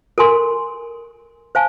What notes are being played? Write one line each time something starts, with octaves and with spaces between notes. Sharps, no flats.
A4 A#4 G#5 C6
C5 F5 G#5 A5